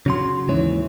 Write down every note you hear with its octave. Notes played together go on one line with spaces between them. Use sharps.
C#3 F#3 C6
D#2 G#2 E3 C#5